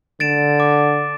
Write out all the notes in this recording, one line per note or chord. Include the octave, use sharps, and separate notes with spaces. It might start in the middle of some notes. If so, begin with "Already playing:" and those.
D3 A6 D7 E7
D6